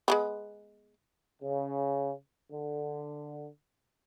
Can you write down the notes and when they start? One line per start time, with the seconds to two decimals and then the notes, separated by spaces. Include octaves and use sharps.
0.08 G#3 A3 B3
1.41 C#3
2.51 D3